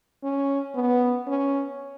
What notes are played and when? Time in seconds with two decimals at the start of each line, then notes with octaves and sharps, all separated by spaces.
0.24 C#4
0.75 B3
1.28 C#4